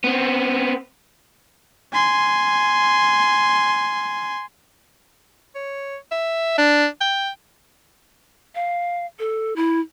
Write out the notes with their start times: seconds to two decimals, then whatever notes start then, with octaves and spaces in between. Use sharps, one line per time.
0.04 B3 C4
1.93 G#5 C6
5.55 C#5
6.11 E5
6.58 D4
7.01 G5
8.55 F5
9.19 A4
9.56 E4